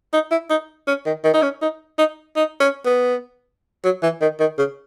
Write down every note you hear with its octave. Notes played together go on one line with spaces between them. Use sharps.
D#4
E4
D#4
C#4
D#3
D#3
D#4
C#4
D#4
D#4
D#4
C#4
B3
F#3
E3
D#3
D#3
C#3